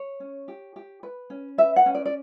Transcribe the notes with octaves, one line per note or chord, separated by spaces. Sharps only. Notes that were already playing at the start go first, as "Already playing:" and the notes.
Already playing: C#5
C#4
G4
G4
B4
C#4
B4 E5
F#5
C#4
D5
D5